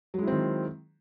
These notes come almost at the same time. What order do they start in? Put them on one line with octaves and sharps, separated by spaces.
F#3 G#3 E4 C4 D#3